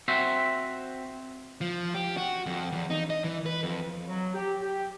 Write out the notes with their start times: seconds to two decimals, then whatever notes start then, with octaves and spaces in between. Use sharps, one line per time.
0.08 C4 F#4 C5 E5
1.61 F3
1.95 G4
2.17 F#4
2.46 F2
2.72 E2
2.90 D#4
3.10 D#5
3.24 E3
3.46 B4
3.63 F2
4.07 F#3
4.34 G4
4.62 G4